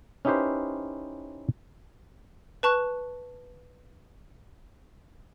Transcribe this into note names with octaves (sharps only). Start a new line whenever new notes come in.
C#4 D#4 E4 G4 B4 C5
B4 A5 C#6 F#6